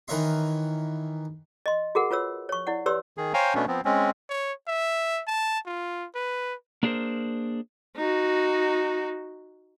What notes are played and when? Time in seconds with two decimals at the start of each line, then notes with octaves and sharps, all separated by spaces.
0.08 D#3 E3 A#4 C#5 E5 C6
1.66 D#5 C6
1.95 F#4 G#4 A#4 F#5
2.11 F4 B4 C#5 E6
2.49 C#5 C#6
2.67 E4 D5 F#5
2.86 G4 B4 C#5 D5 C6 E6
3.18 D#3 G#4
3.34 C5 C#5 F5 G5 G#5 A#5
3.55 B2 A3 B3 C#4 D4
3.68 F3 B3 C4
3.85 G#3 C4 C#4
4.30 C#5
4.68 E5
5.27 A5
5.66 F4
6.15 B4
6.83 A#3 D4 G4 G#4 A#4 C5
7.96 D#4 F#4